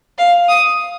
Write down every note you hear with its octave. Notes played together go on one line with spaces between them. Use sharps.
F5
D#6